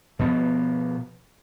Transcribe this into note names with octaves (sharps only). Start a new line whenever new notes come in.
B2 F3 B3